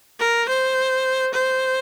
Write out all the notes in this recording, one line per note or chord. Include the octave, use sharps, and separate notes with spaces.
A#4
C5
C5